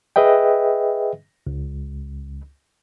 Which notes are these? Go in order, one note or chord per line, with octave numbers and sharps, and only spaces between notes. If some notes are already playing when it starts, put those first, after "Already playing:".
G#4 B4 D#5 E5 G5
C#2